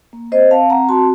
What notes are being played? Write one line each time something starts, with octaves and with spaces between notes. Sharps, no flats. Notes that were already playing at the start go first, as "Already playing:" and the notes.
A#3
C4 C5 D#5
C4 F5 A5
C4 F#5 A#5
F#4 A5 C6